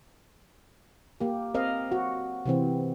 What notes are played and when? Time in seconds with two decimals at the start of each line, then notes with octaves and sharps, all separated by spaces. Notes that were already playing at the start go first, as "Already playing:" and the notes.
1.21 A#3 G4
1.54 C4 A#4 D#5 F5
1.92 F#4
2.46 C3 E3 C4